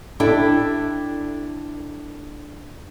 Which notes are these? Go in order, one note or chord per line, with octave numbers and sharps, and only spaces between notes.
D4 E4 G4 A4